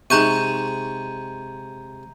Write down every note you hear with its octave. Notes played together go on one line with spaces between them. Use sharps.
C3 G#3 D#4 G#4 A#5 C#6 G6 D#7